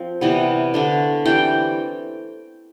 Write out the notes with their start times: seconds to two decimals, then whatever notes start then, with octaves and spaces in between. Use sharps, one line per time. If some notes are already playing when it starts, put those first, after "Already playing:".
Already playing: F3 C4
0.21 C3 E3 G3 B3
0.74 D3 A3 D4
1.25 E3 G3 C4 G5